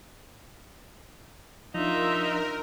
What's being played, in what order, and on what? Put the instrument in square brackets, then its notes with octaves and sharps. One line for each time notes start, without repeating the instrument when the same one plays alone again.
[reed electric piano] F3 D4 [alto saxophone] D#4 [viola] F4 E5 [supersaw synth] A#4